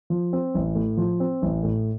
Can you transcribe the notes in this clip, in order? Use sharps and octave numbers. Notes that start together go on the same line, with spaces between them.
F3
C4
A1
A2
F3
C4
A1
A2